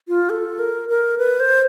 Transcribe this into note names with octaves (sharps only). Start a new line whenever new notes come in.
F4
A4
A#4
A#4
B4
C5